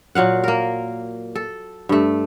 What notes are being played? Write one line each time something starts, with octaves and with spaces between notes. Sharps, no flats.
A#2 F#3 F5 F#5
A#3 A#4
A4
G2 A3